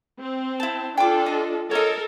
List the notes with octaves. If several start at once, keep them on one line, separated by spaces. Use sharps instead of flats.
C4
E4 A5
D4 F4 A4 G5 D6
D#5
A4 A#4 C#5 D#5